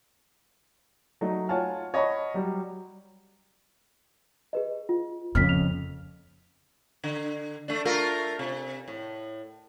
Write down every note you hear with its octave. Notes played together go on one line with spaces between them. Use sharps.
F#3 A3 D#4
F4 C#5 F#5 G#5 A5 F6
C#5 D#5 F#5 A5 B5 C#6
F#3 G3
G#4 B4 D#5
F4
F2 C#3 F6 B6
F7
D3
A3 D4
A3 F4 A#4
C3
A2